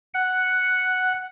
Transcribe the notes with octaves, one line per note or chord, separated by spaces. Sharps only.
F#5